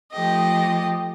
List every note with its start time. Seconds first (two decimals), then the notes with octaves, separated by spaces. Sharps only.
0.12 F3 A3 G4 D#5